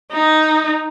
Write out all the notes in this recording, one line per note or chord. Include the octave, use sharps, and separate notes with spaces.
D#4